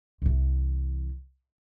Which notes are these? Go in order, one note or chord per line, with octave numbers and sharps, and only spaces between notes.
C2 E3